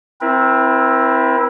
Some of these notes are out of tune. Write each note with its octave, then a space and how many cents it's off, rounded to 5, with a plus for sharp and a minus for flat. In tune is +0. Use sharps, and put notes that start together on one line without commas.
C4 +0 E4 +0 A#4 +40